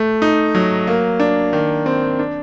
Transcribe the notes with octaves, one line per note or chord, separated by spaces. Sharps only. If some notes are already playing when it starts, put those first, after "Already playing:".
Already playing: A3
D#4
F#3
A#3
D4
D#3
C4
D4